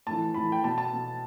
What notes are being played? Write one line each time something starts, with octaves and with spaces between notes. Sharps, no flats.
A2 E3 A5
A2 E3 B5
G5
B2 A5
A5
B2